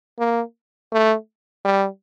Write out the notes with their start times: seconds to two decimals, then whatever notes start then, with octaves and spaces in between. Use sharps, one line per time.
0.19 A#3
0.93 A3
1.65 G3